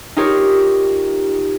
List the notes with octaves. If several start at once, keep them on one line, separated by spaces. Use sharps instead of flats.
D#4 F4 G4 A#4 C#5